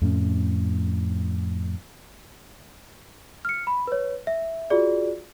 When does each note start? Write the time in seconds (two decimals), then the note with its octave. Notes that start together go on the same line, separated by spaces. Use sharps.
0.02 F2 A2 C#4
3.45 F6 C#7
3.67 B5
3.87 B4 C#5
4.27 E5
4.70 F4 F#4 G#4 D5